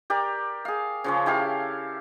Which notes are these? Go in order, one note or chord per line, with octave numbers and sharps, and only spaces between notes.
G4 A#4 D5
G#4 F5
C#3 F3 C#4
E4 G4 A4 F5